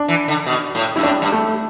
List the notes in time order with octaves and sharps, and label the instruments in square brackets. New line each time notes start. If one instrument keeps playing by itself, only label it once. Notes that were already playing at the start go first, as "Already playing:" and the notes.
Already playing: [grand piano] D4
[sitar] E3
D3
B2
A2
[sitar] G2 [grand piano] E4
[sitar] A2 [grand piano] D4
[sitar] G2
[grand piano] A3